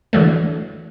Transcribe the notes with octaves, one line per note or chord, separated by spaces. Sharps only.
D3 E3 F#3 A3